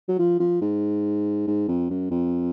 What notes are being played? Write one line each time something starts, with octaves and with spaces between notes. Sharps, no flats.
F#3
F3
F3
G#2
G#2
F2
F#2
F2